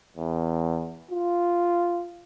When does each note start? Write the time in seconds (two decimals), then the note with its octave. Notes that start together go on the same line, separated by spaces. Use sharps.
0.17 E2
1.11 F4